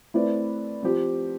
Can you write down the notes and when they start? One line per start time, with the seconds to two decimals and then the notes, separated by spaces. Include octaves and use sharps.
0.14 A3 C4 E4 B4 D5
0.83 F3 C4 G4